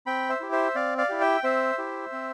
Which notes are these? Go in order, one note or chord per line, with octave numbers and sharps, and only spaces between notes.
C4 G5 B5
C5 E5
E4 G4
C5 E5
C4 D5 F5
D5 F5
E4 G4
E5 G5
C4 C5 E5
E4 G4
C4